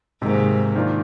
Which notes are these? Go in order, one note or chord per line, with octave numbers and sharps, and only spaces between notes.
G#2 C3 D#3 A#3
D#3 A#3 D4 F4